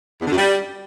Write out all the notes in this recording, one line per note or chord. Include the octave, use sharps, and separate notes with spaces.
E2
D3
F#2
G3